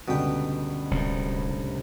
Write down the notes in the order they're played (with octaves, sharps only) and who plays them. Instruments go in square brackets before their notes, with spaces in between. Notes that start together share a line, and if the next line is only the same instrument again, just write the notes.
[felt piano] C#2 G2 D3 [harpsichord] B2 G5
[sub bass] D1 [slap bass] C2 A2